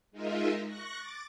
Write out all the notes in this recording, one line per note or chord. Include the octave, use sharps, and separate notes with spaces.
G#3 D#4 F4 A#4 D#5 E5
C#6 F#6 A#6
D6 A6